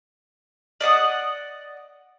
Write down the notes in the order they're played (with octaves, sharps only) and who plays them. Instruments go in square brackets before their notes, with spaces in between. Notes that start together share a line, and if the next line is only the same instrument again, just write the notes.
[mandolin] D5 D#5 F#5 D#6